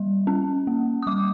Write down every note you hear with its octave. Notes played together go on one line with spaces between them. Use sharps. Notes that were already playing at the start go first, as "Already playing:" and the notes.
Already playing: G3
C#4
A#3
D#6
G3 D6